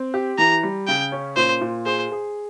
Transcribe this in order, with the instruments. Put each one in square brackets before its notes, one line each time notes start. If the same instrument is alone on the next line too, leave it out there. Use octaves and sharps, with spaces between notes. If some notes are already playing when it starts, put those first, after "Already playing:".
Already playing: [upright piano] C4
G4
[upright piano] E3 [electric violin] A#5
[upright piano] G3
[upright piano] C#3 [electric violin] G5
[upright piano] C#4
[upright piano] A#2 [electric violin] C5
[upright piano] A#2
[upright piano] G#4 [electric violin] C5
[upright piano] G#4